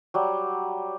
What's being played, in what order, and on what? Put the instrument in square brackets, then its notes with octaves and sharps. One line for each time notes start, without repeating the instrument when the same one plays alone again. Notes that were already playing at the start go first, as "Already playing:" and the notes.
[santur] F#3 G3